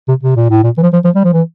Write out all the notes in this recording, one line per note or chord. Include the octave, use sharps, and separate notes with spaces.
C3
C3
A#2
A2
A#2
E3
F3
F3
F3
G3
F3
E3